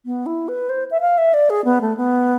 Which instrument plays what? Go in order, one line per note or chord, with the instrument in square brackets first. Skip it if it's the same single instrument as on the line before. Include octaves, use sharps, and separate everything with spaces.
[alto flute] B3
E4
B4
C5
E5
F5
E5
D5
G#4
B3
A3
B3